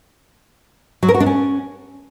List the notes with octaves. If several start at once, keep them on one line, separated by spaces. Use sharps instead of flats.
F#3
A#4
F#4
D4
C#4